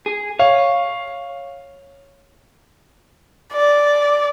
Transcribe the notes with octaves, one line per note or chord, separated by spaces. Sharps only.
G#4
C#5 F5
D5